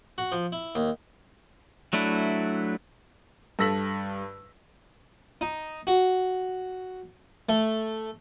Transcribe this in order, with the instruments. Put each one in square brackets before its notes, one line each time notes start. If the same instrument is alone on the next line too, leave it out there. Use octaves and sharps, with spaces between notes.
[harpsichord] F#4
F3
E4
D#2
[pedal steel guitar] F#3 A3 D4 E4
[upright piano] G2 A4 E6 A#6 B6 F#7
[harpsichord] D#4
F#4
A3